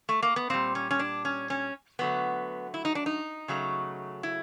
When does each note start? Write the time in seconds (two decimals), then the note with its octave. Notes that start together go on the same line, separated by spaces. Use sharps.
0.09 A3
0.23 A#3
0.36 B3
0.50 A#2 G3 C4
0.75 C#4
0.91 C#4
0.99 D4
1.25 C#4
1.50 C#4
1.99 D3 F#3 A3 B3
2.74 E4
2.85 D#4
2.95 D4
3.06 D#4
3.48 C#3 F#3 A3
4.23 E4